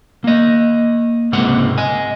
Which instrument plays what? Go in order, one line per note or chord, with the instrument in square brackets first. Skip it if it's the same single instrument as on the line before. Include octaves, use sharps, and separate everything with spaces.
[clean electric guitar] A#3 D#5
C#2 G#2 C3 G#3 A#3 F#5
D#5 G#5